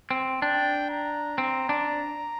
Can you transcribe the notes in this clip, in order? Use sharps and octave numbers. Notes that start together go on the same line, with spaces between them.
C4
D4 G5
A#5
C4
D4